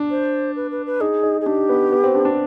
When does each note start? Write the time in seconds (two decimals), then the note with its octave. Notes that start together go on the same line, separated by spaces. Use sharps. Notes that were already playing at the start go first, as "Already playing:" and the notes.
Already playing: D4
0.10 C5
0.56 B4
0.71 B4
0.86 B4
1.01 D#4 G#4
1.23 D#4
1.41 G#4
1.46 D4 G4
1.69 B3
1.92 B3
2.04 C4
2.15 D4
2.25 D4